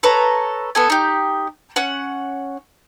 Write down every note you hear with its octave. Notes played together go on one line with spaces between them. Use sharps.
A4 B4 C#5 A#5
B3 A4 G#5
D#4 G4
C#4 F#5